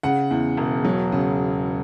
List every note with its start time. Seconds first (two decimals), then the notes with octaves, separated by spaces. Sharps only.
0.03 C#3 F#5
0.31 E2
0.57 E1
0.85 F#3
1.12 C#3